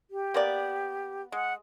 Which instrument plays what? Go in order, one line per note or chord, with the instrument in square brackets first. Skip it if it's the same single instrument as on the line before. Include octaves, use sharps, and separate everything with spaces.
[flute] G4
[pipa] A#3 B3 D5
[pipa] G#3 [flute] F#5